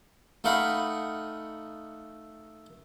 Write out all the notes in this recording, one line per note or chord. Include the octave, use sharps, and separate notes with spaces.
A3 D#4 F5 F#5 B5